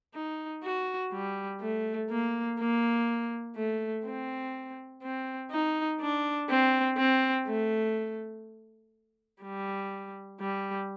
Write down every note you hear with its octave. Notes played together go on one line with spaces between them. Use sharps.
D#4
F#4
G3
A3
A#3
A#3
A3
C4
C4
D#4
D4
C4
C4
A3
G3
G3